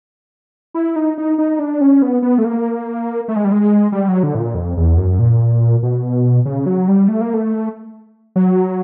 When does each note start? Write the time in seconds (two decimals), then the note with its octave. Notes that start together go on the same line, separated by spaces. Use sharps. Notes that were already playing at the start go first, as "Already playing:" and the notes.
0.74 E4
0.96 D#4
1.18 D#4
1.38 D#4
1.59 D4
1.81 C#4
2.02 B3
2.22 B3
2.38 A3
2.44 A#3
3.28 A3
3.36 G#3
3.45 G3
3.52 G#3
3.92 G3
4.08 F#3
4.23 D3
4.35 A2
4.40 A#2
4.55 F2
4.77 E2
4.97 F#2
5.19 A#2
5.83 B2
6.46 C#3
6.66 F#3
6.88 G3
7.08 A3
7.21 A#3
7.34 A3
8.36 F#3